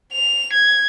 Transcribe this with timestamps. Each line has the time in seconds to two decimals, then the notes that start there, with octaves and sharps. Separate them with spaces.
0.13 F7
0.53 G#6